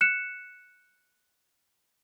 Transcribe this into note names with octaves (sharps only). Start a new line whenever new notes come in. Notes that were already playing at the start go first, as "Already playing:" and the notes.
F#6 C#7 E7